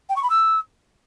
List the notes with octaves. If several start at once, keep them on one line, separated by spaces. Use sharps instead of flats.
G5
C#6
B5
E6